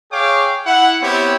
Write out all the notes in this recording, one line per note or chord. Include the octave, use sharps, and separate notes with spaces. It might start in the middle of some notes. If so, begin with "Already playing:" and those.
G#4 C#5 F5 G5 D6
E4 F#5
B3 C4 E4 G4 C#5